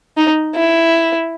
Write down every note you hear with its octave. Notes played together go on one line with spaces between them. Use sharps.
D#4
E4